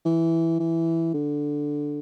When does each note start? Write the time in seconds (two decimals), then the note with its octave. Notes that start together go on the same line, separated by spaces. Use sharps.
0.05 E3
0.60 E3
1.14 D3